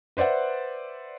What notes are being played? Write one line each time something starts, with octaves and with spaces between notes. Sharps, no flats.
B4 C5 D5 E5 F#5